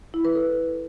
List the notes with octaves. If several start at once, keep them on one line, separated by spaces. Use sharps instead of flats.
E4
B4
A4